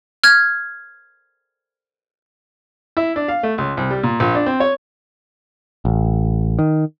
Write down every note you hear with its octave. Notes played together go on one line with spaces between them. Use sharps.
F6 G#6
E4
D4
F5
A3
C#2
C2
G3
A#2
A#1
D4
C4
C#5
A1
D#3